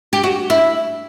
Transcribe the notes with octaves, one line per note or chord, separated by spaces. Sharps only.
G4
F#4
E4